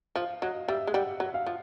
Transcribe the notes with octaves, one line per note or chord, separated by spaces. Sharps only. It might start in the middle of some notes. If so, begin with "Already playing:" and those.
F3 F5
F#3 D#5
G3 E5
G#3
G3 F#5
F#3
F5
F3